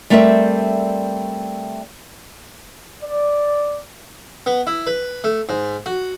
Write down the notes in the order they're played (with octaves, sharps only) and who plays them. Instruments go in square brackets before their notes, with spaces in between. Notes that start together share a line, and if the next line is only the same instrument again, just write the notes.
[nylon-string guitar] G3 A3 C4 A#4 D5 E5
[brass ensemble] D5
[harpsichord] B3
E4
B4
A3
G#2
F#4